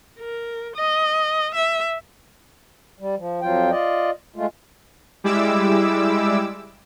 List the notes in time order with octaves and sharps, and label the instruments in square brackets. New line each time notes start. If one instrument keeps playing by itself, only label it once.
[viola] A#4
D#5
E5
[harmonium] G3
F3
F2 F3 F#3 F4 G5
F4 D5 D#5
G#3 A3 F4
[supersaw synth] G3 G#3 E4 D6 E6